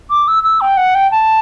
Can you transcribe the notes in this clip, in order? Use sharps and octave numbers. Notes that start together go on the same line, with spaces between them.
D6
E6
E6
G5
F#5
G5
A5